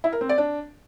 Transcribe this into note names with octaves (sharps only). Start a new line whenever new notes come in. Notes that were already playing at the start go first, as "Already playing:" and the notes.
E4
A#4
C4
D5
D4